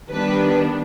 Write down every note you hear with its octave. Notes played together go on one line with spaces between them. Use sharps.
D#3 G3 B3 D4 B4